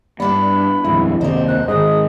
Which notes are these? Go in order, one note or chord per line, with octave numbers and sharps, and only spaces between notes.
G2 B3 D4 E4 D5 B5
D#1 F2 G#3 E4
F#1 D#2 C3 A#4 C5 D5 D#5
F#6
G#2 D#3 G#4 D#5 D#6